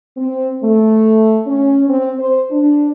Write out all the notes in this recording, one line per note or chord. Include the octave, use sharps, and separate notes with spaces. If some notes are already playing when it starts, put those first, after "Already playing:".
C4
A3
C#4
C4
C5
D4